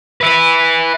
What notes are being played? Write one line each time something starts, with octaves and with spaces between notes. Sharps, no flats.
B4 E5